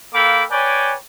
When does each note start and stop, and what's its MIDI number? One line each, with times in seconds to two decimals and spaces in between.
0.14 0.43 58
0.14 0.43 69
0.14 0.43 77
0.14 0.43 79
0.14 0.43 83
0.14 0.43 86
0.50 0.94 71
0.50 0.94 73
0.50 0.94 74
0.50 0.94 79
0.50 0.94 80